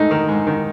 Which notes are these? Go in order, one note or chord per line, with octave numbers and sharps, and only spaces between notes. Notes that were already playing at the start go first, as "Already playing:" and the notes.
Already playing: G#2 A3 D#4
D#3
G#2
D#3